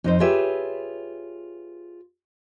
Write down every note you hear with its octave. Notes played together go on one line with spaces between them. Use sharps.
F2 D#4 C5
F4 G4 G#4 B4 C#5 E5